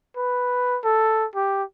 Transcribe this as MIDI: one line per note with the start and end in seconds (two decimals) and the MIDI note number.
0.17 0.79 71
0.84 1.26 69
1.35 1.63 67